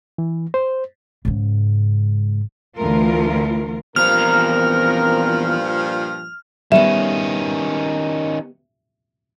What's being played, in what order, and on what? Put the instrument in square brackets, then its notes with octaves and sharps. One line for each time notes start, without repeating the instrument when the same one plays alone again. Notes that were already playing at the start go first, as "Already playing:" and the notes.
[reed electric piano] E3
C5
[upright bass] G#2 C#3
[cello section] D2 E3 A3 F4 A#4
[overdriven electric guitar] E2 A#5 [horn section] G2 A#2 F3 [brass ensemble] C4 A#4 [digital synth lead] F6
[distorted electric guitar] D#3 C#4 [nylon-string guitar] G3 B3 [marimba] E5